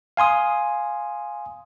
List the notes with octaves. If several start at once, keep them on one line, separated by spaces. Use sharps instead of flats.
F5 G#5 C6 D#6